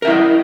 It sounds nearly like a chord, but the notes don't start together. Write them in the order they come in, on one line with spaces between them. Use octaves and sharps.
A#4 E5 E4 D#5